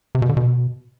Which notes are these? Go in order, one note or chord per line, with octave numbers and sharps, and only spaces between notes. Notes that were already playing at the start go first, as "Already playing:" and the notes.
C3
B2
D3
B2